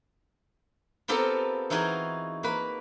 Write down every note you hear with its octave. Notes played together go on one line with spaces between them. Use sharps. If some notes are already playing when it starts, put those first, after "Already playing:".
B3 C4 F4 G4 A4 A#4
E3 D#4 F4 F#4 G#4
A#3 B4